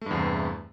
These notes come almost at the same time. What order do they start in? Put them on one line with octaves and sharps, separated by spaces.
A3 G2 E2 C3